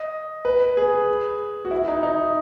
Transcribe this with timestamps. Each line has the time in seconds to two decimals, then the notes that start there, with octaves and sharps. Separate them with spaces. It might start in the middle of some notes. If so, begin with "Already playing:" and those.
Already playing: D#5
0.45 B4
0.77 G#4
1.65 F#4
1.71 E4
1.88 D#4
2.03 D#4